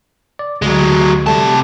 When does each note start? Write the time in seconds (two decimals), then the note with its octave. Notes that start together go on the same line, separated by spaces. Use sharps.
0.39 D5
0.62 D2 F#3 G#3
1.27 C3 G3 A3 A5